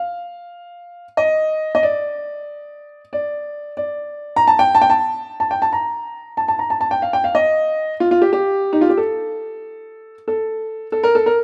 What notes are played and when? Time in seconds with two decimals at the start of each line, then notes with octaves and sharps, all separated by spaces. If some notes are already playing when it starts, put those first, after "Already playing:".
Already playing: F5
1.17 D#5
1.75 D#5
1.83 D5
3.13 D5
3.77 D5
4.36 A#5
4.47 A5
4.59 G5
4.75 A5
4.82 G5
4.90 A5
5.40 A5
5.51 G5
5.62 A5
5.73 A#5
6.37 A5
6.48 A5
6.59 A#5
6.70 A5
6.81 A5
6.91 G5
7.02 F5
7.13 G5
7.24 F5
7.35 D#5
8.00 F4
8.11 F4
8.22 G4
8.33 G4
8.73 D#4
8.81 F4
8.89 G4
8.97 A4
10.28 A4
10.92 A4
11.03 A#4
11.15 A4
11.26 A#4